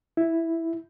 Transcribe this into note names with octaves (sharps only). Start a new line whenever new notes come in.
E4